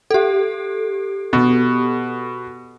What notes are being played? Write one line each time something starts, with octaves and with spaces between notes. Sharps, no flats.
G4 A4
B2